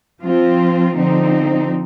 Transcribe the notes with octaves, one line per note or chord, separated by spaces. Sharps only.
F3 C4 F4
D3 F3 C4 D#4